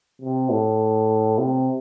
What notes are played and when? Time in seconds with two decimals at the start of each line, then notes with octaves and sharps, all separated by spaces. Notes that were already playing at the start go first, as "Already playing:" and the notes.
0.22 C3
0.51 A2
1.38 C3